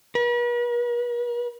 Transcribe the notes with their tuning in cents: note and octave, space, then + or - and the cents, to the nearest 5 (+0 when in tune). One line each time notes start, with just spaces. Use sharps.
B4 -45